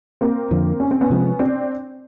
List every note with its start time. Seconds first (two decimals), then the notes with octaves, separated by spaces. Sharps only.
0.21 A#3 C4
0.51 F2 D3 F3
0.80 C#4
0.91 C4
1.01 B3 C#4
1.10 C3 F3 G#3 C4
1.39 C4 D4